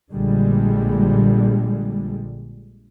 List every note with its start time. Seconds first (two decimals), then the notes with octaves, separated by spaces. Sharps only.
0.11 A#1 D3 G3 G#3